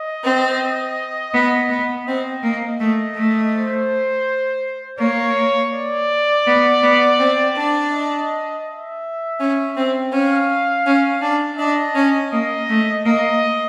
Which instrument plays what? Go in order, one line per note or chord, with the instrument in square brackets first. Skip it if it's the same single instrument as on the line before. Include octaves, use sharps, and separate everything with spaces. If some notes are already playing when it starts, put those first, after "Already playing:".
Already playing: [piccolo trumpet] D#5
[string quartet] C4
B3
B3
[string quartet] C4 [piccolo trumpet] D#5
[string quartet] A#3
[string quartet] A3 [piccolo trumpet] D#5
[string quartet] A3
[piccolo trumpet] C5
[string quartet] A#3 [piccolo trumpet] C#5
[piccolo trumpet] D5
[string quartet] B3
B3
C4
D4
[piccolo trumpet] D#5
E5
[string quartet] C#4
C4
[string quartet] C#4 [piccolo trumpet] F5
[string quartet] C#4
D4
[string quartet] D4 [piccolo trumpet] D#5
[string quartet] C#4
[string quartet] A#3 [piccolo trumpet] D#5
[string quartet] A3
[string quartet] A#3 [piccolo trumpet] D#5